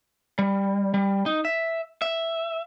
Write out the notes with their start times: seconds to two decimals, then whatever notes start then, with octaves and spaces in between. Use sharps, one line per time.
0.39 G3
0.94 G3
1.26 D#4
1.45 E5
2.02 E5